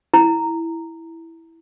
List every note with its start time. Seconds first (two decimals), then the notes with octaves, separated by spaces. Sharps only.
0.13 E4 A#5